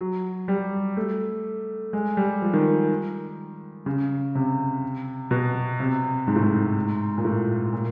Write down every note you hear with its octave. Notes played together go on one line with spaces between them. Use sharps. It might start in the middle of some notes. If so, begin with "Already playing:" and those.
F#3
G3
A3
G#3
G3
F3
D#3
C#3
C3
B2
C3
G#2
A2
G#2
A#2
A2
A#2